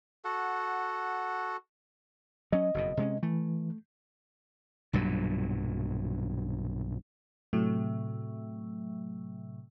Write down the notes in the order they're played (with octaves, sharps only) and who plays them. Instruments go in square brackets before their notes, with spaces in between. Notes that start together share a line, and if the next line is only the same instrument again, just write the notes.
[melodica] F#4 A4 F#5
[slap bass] F#3 C#4 [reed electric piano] D#5
[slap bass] F#1 F2 B2
C3 G#3 C#4
[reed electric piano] E3 [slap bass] A3
[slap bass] B1 G2 A#2 F#3
[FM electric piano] A2 C3 F#3 A3